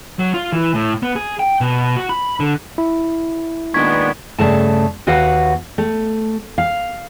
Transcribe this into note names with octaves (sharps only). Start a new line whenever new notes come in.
F#3
F4
E3
A2
B3
G#4
G5
B2
F#4
B5
D3
E4
A#2 D#3 G#3 B3 D4 C#6 G#6 B6
G2 C#3 A3 A5
D#2 F#4 B4 F5 F#5
A3
F5